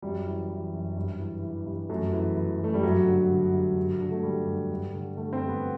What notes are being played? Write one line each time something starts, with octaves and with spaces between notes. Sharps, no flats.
F#2 G3
E3
E3
F#2
G2
E3
E3
G2
F#2 A3
E3
E3
F#2 A3
G3
G2 F#3
D3
D3
G2
G2
D3
A3
D3 G3
G2
G2
D3
D3 A3
C4
G2
B3